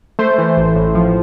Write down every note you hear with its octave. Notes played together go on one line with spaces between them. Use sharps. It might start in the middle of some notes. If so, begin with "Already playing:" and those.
A3 C5
E3
A1
A2
F3